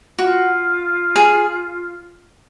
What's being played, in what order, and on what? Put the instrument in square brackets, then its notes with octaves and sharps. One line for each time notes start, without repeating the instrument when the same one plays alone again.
[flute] F4 [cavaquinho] F#4
[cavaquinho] G#4